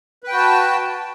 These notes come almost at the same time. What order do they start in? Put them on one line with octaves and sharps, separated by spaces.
B4 G5 F#4 A5